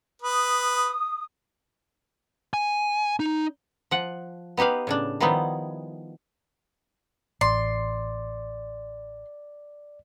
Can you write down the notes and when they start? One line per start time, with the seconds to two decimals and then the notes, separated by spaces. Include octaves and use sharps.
0.22 B4 D#6
2.54 G#5
3.20 D#4
3.91 F3 F#5
4.57 B3 D#4 G4 B4 F5
4.87 A2 C#3 D4
5.20 D#3 F3 G3 B3 D#4 E4
7.41 A1 D5 C6